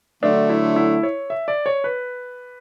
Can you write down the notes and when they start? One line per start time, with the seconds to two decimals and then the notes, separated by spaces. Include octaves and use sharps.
0.23 D3 F#3 A3 D4
0.50 E4
0.76 E4
1.03 C#5
1.30 E5
1.48 D5
1.66 C#5
1.84 B4